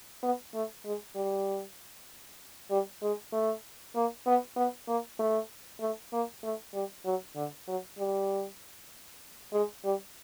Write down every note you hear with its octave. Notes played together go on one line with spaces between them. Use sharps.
B3
A3
G#3
G3
G3
G#3
A3
A#3
B3
B3
A#3
A3
A3
A#3
A3
G3
F#3
D3
F#3
G3
G#3
G3